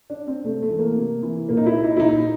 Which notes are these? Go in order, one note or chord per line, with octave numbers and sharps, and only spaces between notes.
D4
C4
C3 A3
A3
E3
A#3
C3
E3
A#2 A#3
D#4
E4
D#4
E4
A#2 D#4